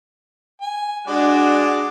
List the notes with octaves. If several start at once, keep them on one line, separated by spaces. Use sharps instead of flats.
G#5
G#3 D4 F#4 D5